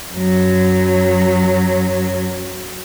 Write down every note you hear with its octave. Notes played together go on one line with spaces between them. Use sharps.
F#2 F#3